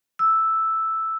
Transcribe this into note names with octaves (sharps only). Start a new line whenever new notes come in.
E6